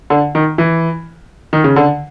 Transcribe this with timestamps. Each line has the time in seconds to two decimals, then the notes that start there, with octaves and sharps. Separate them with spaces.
0.10 D3
0.35 D#3
0.58 E3
1.53 D#3
1.64 C#3
1.76 D3